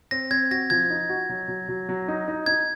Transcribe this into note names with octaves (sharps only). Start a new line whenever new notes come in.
C4 A#6
C4 G#6
F#4 A#6
F3 G#6
D#4
F#4
F#3
F#3
F#3
F#3
D#4
D#4
D#4 G#6